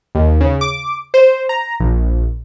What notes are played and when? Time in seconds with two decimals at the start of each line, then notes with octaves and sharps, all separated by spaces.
0.15 D#2
0.41 C#3
0.61 D6
1.14 C5
1.49 A#5
1.80 A#1